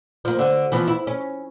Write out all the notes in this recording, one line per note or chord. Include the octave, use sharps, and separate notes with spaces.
F3 A#3
D3 F#4
E3 F3 B3
E4
C#4